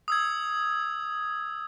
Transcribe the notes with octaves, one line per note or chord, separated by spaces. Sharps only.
D#6 E6 G#6